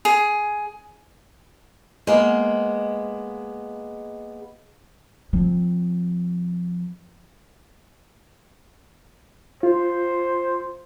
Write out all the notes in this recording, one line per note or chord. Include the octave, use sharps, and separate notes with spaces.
G#4
G#3 A#3 B3
F3 C4
F4 C5